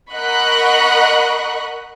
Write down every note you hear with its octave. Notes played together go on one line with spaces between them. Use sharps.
A#4 D#5 F#5 B5 C#6 F#6